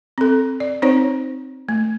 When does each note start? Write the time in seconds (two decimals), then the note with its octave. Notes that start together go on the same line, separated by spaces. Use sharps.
0.18 C4 A4
0.60 D5
0.82 C4 D#4 C5 C#5
1.69 A3